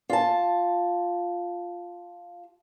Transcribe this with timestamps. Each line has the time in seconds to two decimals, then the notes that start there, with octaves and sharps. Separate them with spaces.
0.09 F4 A5